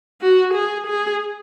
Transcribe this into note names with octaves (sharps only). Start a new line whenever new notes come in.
F#4
G#4
G#4